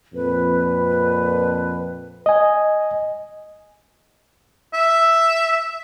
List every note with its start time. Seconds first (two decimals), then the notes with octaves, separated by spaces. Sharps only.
0.14 F2 A#2 B4
2.26 D#5 G#5
4.73 E5